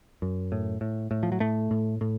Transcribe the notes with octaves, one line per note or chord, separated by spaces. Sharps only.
F#2
A2
A2
A2
F3
F#3
A2 A3
A2
A2